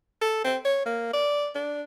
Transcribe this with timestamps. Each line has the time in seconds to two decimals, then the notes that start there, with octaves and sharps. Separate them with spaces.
0.22 A4
0.44 C4
0.65 C#5
0.86 A#3
1.13 D5
1.55 D4